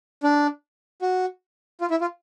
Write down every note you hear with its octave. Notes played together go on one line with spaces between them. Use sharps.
D4
F#4
F4
E4
F4